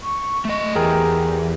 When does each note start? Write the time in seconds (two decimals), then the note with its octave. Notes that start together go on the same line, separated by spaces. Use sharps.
0.03 C#6
0.45 A3 D#5
0.75 E2 G4 G#4 A#4 G5